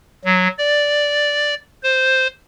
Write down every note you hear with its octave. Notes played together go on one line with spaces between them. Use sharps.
F#3
D5
C5